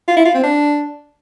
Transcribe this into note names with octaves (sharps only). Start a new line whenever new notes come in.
F4
E4
F4
C4
D4